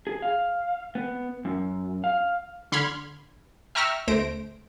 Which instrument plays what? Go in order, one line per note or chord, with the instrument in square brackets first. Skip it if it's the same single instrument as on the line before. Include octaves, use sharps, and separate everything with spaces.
[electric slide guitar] G#4
F5
B3
F#2
F5
[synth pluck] D3 B5 C6 F6 G#6
E5 G5 A#5 C#6 E6 F6
D2 A3 C5 A#6 D7